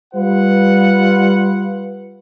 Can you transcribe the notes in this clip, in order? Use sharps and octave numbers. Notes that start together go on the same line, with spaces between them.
G3 F4 B4 F#5